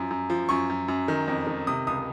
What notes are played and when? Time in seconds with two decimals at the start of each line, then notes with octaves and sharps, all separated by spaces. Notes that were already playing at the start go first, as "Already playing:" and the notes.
Already playing: F#2 F3
0.10 F#2
0.30 F3
0.49 F#2 C#6
0.69 F#2
0.88 F#2
1.08 D#3
1.28 F2
1.47 D#3
1.67 C3 D#6
1.87 C#2 D#6